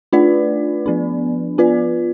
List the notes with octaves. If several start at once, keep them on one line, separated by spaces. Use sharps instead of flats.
A3 D4 F4 B4 D5
F3 B3 D4
B3 F4 B4 D5